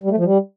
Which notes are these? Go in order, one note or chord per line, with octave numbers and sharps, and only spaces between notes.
G3
A3
F3
G3